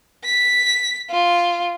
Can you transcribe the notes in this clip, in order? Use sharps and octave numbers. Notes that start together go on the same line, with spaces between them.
B6
F4